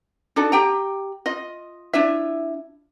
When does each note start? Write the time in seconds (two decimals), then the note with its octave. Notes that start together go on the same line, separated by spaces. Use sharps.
0.36 D4 D#4 F#4 A4
0.52 G4 G5 A#5
1.26 F4 D#5
1.93 D4 E4 F4 E5